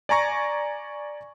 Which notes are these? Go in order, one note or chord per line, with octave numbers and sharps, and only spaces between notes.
D5 G#5 A#5 C#6 A#6